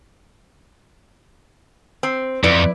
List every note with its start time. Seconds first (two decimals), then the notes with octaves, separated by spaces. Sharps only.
2.03 C4
2.44 F2 E4 B4 D5